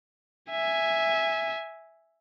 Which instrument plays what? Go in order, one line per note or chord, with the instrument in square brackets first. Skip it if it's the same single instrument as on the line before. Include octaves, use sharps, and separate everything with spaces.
[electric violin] E5 G#5